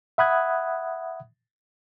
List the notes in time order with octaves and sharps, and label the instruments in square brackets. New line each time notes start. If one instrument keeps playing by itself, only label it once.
[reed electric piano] E5 F#5 B5 D#6 F#6 G#6